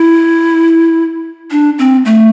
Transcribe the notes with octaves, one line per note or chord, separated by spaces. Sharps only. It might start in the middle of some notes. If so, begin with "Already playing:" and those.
Already playing: E4
D4
C4
A3